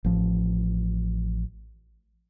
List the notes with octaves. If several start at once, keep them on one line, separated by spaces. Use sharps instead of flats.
A1 F3